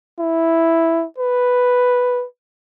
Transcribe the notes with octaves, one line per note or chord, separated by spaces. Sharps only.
E4
B4